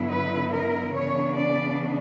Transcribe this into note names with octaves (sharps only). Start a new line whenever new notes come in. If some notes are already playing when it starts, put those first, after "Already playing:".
Already playing: G2 D3 F#3 B3 E4
B4
A#4
C#3 E3 B3 D4 C#5
D5